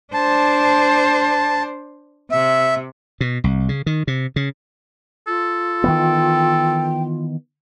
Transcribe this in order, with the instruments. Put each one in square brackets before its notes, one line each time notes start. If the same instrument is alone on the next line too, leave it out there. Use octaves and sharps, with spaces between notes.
[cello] D4 C5 [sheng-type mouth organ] A5
[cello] C3 [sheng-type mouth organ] E5
[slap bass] B2
C2
C#3
D#3
C3
C#3
[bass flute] F4 [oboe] A4
[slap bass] D#3 E3 B3 [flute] G5